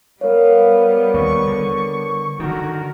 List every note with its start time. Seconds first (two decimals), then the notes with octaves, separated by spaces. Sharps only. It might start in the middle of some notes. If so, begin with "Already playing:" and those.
0.21 G3 B3 A#4 C#5 F5
1.14 D#2 C#6
1.47 D3
2.40 D3 D#3 F#4 A#4